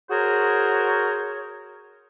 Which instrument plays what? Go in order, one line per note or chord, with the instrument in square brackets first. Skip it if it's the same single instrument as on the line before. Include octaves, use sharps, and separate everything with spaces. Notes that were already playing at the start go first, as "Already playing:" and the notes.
[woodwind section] F#4 G#4 A#4 C5 C#5